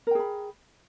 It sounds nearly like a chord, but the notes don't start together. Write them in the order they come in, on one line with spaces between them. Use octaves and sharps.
A#4 G5 G#4 B5